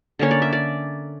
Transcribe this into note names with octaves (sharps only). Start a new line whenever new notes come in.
D3 A#3 C#4 C#5
D5
E5
D5